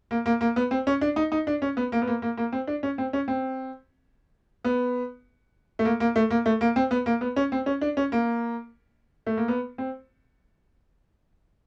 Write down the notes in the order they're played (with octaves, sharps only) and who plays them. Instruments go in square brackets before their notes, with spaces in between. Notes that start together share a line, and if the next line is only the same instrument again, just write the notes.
[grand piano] A#3
A#3
A#3
B3
C4
C#4
D4
D#4
D#4
D4
C#4
B3
A#3
B3
A#3
A#3
A#3
C4
D4
C#4
C4
C#4
C4
B3
A3
A#3
A#3
A3
A#3
A3
A#3
C4
B3
A#3
B3
C#4
C4
C#4
D4
C#4
A#3
A3
A#3
B3
C4